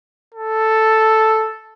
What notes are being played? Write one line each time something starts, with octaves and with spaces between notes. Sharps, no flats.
A4